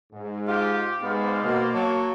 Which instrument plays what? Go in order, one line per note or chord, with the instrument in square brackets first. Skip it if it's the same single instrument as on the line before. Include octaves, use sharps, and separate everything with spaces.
[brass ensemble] G#2
[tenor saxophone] F4 [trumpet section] G4
[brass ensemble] G#2 G#3 [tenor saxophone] B3 [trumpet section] C5 D5 F5
[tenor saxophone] B2 [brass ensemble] A#3
[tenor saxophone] F#3 [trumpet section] F#4 C#5 A5